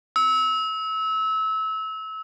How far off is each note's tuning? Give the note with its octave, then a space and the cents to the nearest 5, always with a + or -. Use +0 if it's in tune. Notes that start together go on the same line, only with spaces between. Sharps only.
E6 -25